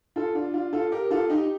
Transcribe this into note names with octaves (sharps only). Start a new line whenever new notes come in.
F4 A4
D4 F4
D4 F4
F4 A4
G4 A#4
F4 A4
D#4 G4